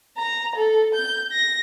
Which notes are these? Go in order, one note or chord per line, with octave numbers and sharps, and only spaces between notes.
A#5
A4
G6
A#6